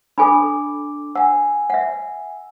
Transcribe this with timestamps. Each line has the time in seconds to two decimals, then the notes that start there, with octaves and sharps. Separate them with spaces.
0.18 D4 A4 G#5 B5 D6
1.15 F#5 G#5 E6
1.70 E5 F#5